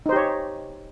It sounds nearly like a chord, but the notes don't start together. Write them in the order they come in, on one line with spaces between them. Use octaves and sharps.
D#4 C5 G4 C#5